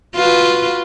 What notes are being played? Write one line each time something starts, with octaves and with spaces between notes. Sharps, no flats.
F4 F#4 B4